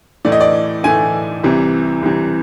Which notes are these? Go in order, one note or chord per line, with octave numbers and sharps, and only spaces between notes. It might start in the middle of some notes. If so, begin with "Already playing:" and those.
A2 E3 A3 D5
D#5
D5
A2 E3 A3 G#5
C2 C3 E3
C2 C3 E3